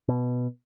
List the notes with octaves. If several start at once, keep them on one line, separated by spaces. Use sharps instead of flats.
B2